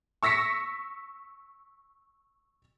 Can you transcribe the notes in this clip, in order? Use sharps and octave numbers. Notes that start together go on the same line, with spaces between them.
C#6 E6 A#6 B6 C#7